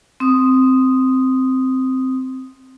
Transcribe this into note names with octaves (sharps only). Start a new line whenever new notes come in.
C4 D#6